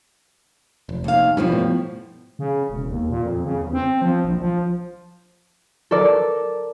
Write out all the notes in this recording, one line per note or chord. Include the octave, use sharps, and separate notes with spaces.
F1
D#2 F5
G2 B2 E3 F3 G3
A2
C#3
E1
D#2
A#2
F2
C#3
E2
C4
F3
A#1
F3
A4 A#4 D5